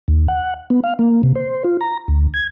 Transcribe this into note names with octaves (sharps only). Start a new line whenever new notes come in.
D#2
F#5
B3
F5
A#3
C3
C5
F4
A#5
D2
G#6